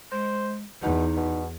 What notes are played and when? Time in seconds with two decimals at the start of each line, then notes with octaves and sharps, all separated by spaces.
0.12 G#3 C5
0.82 E2 B2 D#4
1.16 B2